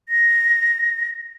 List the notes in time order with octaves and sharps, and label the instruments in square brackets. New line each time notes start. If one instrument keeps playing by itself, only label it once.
[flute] A#6